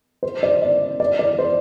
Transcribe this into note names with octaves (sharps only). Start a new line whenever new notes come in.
C5
D5
D5
D5
D5
C5